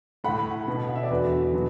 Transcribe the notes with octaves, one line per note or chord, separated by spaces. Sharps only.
A2 A3 F#5 B5
B2 B3
F#5
E5
D5
E2 D3 B3 F#4 B4
B2 F#3 B3